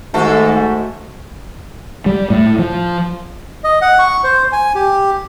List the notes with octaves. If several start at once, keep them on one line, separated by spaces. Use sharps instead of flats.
D#2 G#2 A3 F#4 A4
G3
A2
F3
D#5
F#5
C#6
C5
G#5
G4